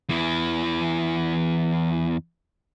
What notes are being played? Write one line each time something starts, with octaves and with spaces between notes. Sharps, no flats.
E2 E3